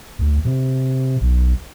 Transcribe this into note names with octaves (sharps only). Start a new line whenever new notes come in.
D2
C3
B1